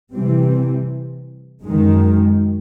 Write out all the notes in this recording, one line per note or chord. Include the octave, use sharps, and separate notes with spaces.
C3 E3 G3 C4
F#2 D#3 G#3